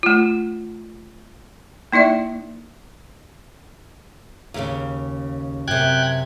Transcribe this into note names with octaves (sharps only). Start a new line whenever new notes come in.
A3 F4
A#3 D#4 E4 D5 E5
D#2 A2 C#3
F#2 C3 G5 F#6 G#6